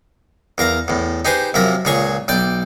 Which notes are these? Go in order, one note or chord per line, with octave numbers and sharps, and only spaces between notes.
E2 A#4 F5 A#5
E2 A2
D#4 G4 G#4 B4 C5
F#2 C3 F3 A#4 B5
C#2 A#2 G#4 C#5 C#6
B1 D5 G5